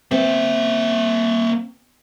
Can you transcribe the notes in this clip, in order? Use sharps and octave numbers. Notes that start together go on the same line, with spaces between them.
A#3 C4 E5